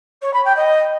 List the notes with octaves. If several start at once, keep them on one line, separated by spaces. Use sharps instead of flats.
C#5
B5
G5
D#5